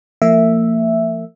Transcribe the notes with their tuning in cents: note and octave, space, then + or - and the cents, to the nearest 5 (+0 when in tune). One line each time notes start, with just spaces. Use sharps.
F3 -30 A#3 -40 E5 +0